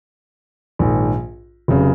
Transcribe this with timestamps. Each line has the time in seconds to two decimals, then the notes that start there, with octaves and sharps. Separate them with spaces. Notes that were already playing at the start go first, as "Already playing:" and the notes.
0.79 A#1 G#2 D#3
1.68 F1 C#3 F#3